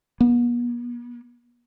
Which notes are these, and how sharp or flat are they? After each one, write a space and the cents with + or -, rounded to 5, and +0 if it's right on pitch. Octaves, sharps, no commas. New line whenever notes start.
B3 -45